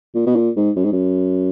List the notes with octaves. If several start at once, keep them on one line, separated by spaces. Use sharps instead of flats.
A#2
B2
A#2
G#2
F#2
G#2
F#2